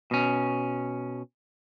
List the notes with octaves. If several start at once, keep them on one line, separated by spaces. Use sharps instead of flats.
B2 C#4